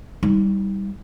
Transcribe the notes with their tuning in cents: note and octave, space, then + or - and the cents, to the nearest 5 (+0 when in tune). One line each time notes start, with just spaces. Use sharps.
G3 +0 D#4 +35